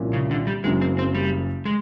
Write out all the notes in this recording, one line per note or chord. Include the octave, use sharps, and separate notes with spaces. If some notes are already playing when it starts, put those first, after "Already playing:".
Already playing: C2 A#2 F3 A#3 C#4
C#3
D3
G3
F#1 F#2 C#3 G#3
C4
C4
G3
G#3